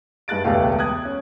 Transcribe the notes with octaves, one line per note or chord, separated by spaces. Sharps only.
G2 G#3 F#6 A6 D7
E1 C#2 A3 G4 F5
D#6 F#6 G#6
C#4